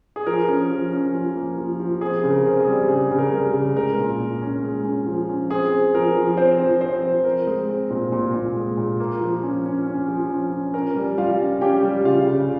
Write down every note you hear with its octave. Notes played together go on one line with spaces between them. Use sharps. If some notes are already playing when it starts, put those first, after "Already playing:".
G#4
F3 A#4
C#4
F3
C#4
F3
A#3
F3
F3
C4 G#4
C#3
A#4
C4
G#4
G3
C#3 G#4
C#3
A#4
G3
C#3
G#3 A#4
A#2
A#2
C#4
G#3
C#4
F3
C#4
C4 G#4
C4
F3 A#4
F3
C4 C5
F3
C4 C5
F3
C4 A#4
G#3
C4
A#2
A#2
A#2
G#3
A#2
A#3
F3
C#4
C#4
C#4
F3
C#4
C#4
C#4 A#4
G3
G3 F4 F5
C#4
C#4 G4 G5
G3
C#3 F4 F5
C#3